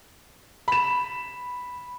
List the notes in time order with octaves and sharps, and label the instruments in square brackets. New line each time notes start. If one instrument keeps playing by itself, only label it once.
[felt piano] B5 E7